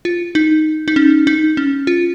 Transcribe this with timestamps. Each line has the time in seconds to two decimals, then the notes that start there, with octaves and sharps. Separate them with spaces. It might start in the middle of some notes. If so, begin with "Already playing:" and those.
0.05 F4
0.35 D#4
0.88 D#4
0.96 C#4
1.27 D#4
1.57 C#4
1.87 F4